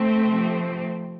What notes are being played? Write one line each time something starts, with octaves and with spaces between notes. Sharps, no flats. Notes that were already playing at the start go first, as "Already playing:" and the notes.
Already playing: A3 C4
C3 F3